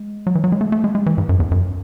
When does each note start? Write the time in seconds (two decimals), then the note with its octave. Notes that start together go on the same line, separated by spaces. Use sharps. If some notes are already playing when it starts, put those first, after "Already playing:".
Already playing: G#3
0.27 F#3
0.35 E3
0.44 F#3
0.52 G#3
0.61 A3
0.72 A3
0.84 G#3
0.95 G#3
1.06 E3
1.18 G#2
1.29 F#2
1.40 E2
1.51 F#2